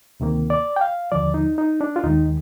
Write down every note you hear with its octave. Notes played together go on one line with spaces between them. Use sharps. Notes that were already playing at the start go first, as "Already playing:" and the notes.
D2 C3 D#3 A#3
D5
G5
F5
D#2 D3 F3 D5
D#4
D#4
D4
F4
D#2 D#3 G#3 D#4